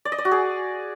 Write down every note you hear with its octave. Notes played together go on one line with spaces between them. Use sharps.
D5
D#5
D5
F#4
G#4